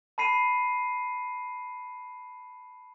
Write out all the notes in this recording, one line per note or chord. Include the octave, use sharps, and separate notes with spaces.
A5 B5 C7 D#7